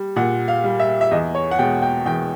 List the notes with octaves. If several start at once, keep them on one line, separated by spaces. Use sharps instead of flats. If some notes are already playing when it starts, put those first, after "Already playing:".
Already playing: G3
A#2 F#5
F5
G3
E5
E5
E2 D#5
C#5
F#5
B2 G#3 G5
G5
E2 G5